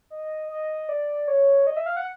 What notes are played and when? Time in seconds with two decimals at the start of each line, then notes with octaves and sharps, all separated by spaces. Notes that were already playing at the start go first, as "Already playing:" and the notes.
0.10 D#5
0.49 D#5
0.89 D5
1.28 C#5
1.67 D#5
1.76 E5
1.86 F5
1.97 F#5